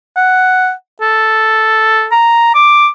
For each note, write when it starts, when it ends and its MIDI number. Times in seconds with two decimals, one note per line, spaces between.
0.17 0.71 78
1.01 2.07 69
2.12 2.50 82
2.55 2.88 86